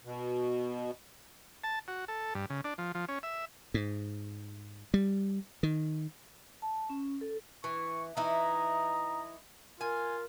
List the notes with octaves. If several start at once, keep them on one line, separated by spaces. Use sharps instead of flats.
B2
A5
F#4
A4
G2
C#3
D4
F3
F3
C#4
E5
G#2
G3
D#3
A5
C#4
A4
E3 C#6
E3 D#4 E4 D#5 A#5
F4 A#4 G#5